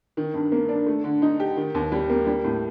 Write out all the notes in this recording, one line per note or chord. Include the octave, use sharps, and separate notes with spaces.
D#3
G2
A#3
D4
A3
D3
D#4
G4
D#3
D#2
G3
A#3
G3
A2